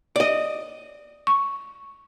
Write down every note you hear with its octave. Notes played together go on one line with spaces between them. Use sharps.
D5 D#5
C#6